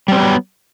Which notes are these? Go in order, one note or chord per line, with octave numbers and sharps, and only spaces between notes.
F#3 G3 B3 C4